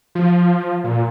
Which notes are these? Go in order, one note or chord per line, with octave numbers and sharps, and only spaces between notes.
F3
A#2